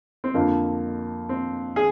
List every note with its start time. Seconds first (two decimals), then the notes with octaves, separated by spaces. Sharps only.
0.24 C4
0.34 F2 D3 A#3
1.29 C4
1.76 G#4